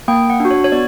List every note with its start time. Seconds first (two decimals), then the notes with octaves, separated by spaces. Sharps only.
0.08 A#3 G5
0.30 F#5
0.40 D4 F#4
0.51 C#5
0.64 C#5
0.72 B3 D5